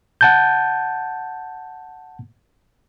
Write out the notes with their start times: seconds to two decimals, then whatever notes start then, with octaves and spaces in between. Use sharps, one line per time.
0.21 F#5 A5 G6